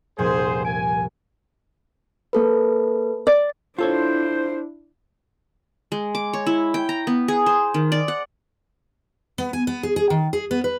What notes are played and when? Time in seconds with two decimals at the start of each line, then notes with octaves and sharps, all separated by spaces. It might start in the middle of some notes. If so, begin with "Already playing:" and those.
0.18 F1 C2 A#2 G#4 C5
0.65 G#5 D7
2.33 A#3 A4 B4
3.27 D5
3.78 D4 E4 F4 A4 C5 C#5
5.92 G#3
6.15 D6
6.33 C#5
6.46 E4
6.74 G5
6.89 A#5
7.07 B3
7.28 G#4
7.46 C5
7.74 D#3
7.92 D5
8.08 F#5
9.38 B3
9.53 G#5
9.67 B3
9.83 G#4
9.96 G#4
10.10 D#3
10.33 G#4
10.51 B3
10.64 B4